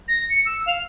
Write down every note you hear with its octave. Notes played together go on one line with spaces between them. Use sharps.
A#6
C#7
E6
F5